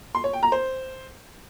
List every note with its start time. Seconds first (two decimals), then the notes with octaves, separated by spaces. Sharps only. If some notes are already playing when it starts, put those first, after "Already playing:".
0.15 C6
0.24 C#5
0.33 G5
0.43 A#5
0.52 C5